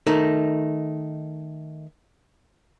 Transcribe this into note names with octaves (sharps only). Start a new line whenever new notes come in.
D#3 A3 D#4